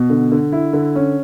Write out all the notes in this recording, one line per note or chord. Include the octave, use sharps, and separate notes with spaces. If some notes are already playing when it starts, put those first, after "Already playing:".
Already playing: B2
D3
D3
E4
D3
C#4